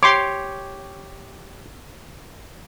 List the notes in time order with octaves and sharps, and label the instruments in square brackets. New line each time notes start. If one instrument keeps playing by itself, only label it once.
[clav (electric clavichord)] G4 C#5 [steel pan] C6 D6